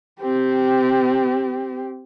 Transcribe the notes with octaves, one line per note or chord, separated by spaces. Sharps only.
C4 G4